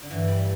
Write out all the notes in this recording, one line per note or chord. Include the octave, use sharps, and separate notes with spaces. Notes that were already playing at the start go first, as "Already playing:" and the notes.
D3
G2 E3
G3